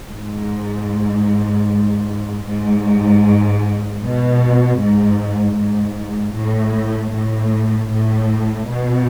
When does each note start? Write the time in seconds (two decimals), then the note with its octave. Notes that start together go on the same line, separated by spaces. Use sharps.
0.10 G#2
2.45 G#2
4.01 B2
4.79 G#2
5.57 G#2
6.35 A2
7.13 A2
7.92 A2
8.69 B2